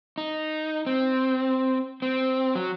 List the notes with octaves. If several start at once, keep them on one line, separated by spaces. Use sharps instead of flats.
D#4
C4
C4
F#3